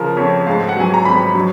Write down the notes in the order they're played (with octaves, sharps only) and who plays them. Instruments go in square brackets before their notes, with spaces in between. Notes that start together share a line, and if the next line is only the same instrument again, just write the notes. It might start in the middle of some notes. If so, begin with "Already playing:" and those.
Already playing: [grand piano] C#3 F3 A#4
F2 C#5
G#2 F5
F#5
F#3 G#5
A#5
G#1 B5
F#3